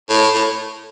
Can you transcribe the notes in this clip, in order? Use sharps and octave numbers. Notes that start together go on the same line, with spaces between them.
A2
A2